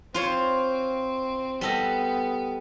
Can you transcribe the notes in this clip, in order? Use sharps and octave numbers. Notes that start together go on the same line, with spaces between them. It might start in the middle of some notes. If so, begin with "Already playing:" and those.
C4 F4 C5 C#5
G3 B3 A4 D#5